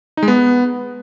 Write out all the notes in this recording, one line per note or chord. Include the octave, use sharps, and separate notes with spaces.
D#4
G#3
B3